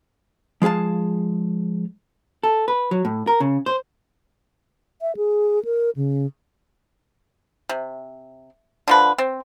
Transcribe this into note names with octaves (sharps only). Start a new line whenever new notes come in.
F3 G#3 G#4 F5 A5
A4
B4
F#3
A2
A#4
C#3
C5
E5
G#4
A#4
C#3
C3
D3 F3 B4
C4